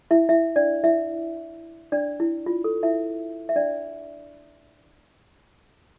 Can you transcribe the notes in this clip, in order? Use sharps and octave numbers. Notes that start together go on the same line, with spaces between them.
E4 E5
E4 E5
D4 D5
E4 E5
D4 D5
E4
F4
A4
E4 E5
E5
D4 D5